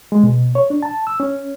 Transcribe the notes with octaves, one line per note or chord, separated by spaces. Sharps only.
G#3
B2
C#5
D4
A5
E6
C#4